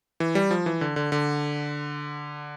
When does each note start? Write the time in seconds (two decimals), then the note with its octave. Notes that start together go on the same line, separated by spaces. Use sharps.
0.20 E3
0.35 G3
0.51 F3
0.66 E3
0.81 D3
0.96 D3
1.12 D3